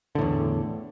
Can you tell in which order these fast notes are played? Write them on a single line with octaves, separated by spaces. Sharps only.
D3 A2 E2